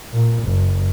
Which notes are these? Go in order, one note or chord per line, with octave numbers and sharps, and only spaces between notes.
A#2
F#1